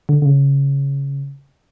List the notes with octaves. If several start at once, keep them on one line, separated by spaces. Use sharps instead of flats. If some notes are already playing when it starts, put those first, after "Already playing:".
D3
D3
C#3